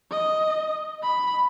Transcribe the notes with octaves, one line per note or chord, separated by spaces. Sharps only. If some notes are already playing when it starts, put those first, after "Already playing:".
D#5
B5